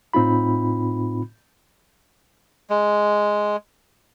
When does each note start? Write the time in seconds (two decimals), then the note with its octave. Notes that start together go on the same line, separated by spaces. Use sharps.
0.14 A2 C4 D#4 F4 B5
2.70 G#3